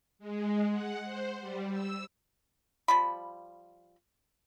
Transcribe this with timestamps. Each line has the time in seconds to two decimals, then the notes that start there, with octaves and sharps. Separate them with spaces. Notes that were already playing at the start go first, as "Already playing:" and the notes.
0.19 G#3
0.71 F#5
1.04 C5
1.40 G3
1.71 E6
2.88 F3 G3 B5